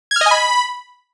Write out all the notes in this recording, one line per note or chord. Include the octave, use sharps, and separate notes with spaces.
G#6
F6
D#5
G#5
B5